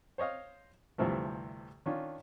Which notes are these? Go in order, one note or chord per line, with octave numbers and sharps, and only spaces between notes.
C5 C#5 D#5 F5
D2 G2 C3 E3 F3 A3
D#3 C#4 D4 F4